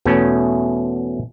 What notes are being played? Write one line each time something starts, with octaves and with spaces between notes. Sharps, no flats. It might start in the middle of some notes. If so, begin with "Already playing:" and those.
E2 B2 A3 C#4